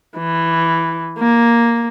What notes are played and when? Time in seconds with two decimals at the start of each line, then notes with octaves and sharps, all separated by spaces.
0.17 E3
1.18 A#3